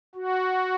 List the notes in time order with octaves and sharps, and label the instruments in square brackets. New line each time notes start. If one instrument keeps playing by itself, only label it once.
[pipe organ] F#4